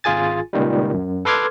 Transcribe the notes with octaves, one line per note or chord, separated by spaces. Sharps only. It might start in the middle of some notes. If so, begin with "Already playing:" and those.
G#1 F4 G#4 G#5 A6
C#2 A#2 D#3 G3
F#2
A4 B4 C6 D6 F6 G#6